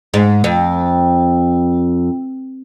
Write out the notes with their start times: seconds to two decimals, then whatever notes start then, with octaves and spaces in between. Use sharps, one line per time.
0.14 G#2
0.44 F2